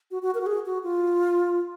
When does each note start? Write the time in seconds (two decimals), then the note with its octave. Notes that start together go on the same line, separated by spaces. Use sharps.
0.11 F#4
0.22 F#4
0.35 A#4
0.41 F#4
0.46 G#4
0.66 F#4
0.83 F4